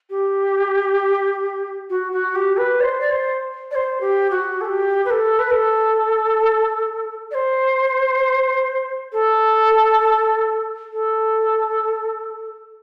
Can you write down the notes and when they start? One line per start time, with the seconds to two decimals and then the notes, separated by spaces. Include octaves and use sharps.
0.10 G4
1.90 F#4
2.12 F#4
2.35 G4
2.57 B4
2.80 D5
2.83 C5
3.01 D5
3.11 C5
3.71 D5
3.75 C5
4.01 G4
4.31 F#4
4.61 A4
4.65 G4
5.06 B4
5.10 A4
5.39 B4
5.51 A4
7.31 D5
7.34 C5
9.12 A4
10.93 A4